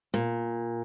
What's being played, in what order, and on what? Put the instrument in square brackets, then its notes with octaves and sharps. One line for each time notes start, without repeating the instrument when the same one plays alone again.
[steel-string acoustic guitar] A#2